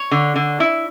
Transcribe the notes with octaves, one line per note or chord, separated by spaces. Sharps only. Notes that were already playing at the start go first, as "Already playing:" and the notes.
Already playing: C#5
D3
D3
E4